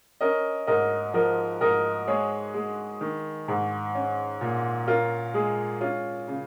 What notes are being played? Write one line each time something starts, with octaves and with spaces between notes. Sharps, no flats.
C#4 A#4 D#5
G#2 A#4 D#5
F3 A#4 D#5
G#2 A#4 D#5
G#3 G#4 C#5
G#3
D#3
G#2
C#4
A#2
C#4 F4 A#4
G#3 G#4
C#4 F4
C#3